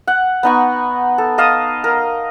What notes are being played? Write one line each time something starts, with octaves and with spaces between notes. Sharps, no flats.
F#5
B3 D#4 C#6
A4
D#5 F5 A5 D#6
A#4